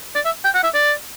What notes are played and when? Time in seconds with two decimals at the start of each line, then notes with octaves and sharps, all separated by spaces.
0.15 D5
0.25 E5
0.44 G5
0.54 F#5
0.63 E5
0.74 D5